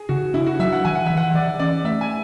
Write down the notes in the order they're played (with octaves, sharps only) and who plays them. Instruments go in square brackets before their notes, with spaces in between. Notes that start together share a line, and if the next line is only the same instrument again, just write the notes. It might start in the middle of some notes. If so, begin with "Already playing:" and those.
Already playing: [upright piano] G#4
[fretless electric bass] C#3 [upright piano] F#4
[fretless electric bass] D4 [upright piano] E4
[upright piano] F#4
[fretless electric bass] F#3 [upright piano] E5
[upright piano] F#5
[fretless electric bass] E3 [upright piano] G#5
[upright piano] F#5
[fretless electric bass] E3 [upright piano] E5
[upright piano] F#5
[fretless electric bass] E3 [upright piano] D5
[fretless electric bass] C#4 [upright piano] D5
[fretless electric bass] A3 [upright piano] E5
[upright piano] G#5